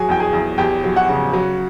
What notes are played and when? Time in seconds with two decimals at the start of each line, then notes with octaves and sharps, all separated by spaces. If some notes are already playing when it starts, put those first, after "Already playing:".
Already playing: F#3 G#4 G#5
0.09 E2 G5
0.20 G#4 G#5
0.33 E2
0.58 E2 G4 G5
0.84 F#3
0.96 F#4 F#5
1.09 C#3
1.33 F#3